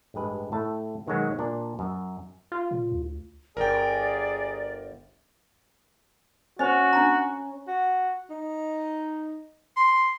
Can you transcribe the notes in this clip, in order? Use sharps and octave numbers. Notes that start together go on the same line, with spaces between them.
A1 G2 G#3 B4
A2 A3 A5
B2 D#3 F#3 G#3 F#4
A#2 D4
F#2
F4
A#2
D2
G1 G#4 A#4 D5 G5
C#4 F#4 C5 D#5
D4 A#5
F#4
D#4
C6